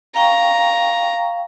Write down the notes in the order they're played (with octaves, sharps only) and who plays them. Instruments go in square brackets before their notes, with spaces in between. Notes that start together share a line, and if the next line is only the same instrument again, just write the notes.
[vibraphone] F5 G5 C#6 [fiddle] A#5